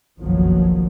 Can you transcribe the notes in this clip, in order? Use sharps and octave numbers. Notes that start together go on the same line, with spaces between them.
F#1 B1 F2 D#3 F3 F#3